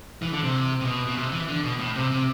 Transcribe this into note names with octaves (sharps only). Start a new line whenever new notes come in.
E3
D3
C3
C3
B2
B2
C3
E3
D3
B2
A2
C3
C3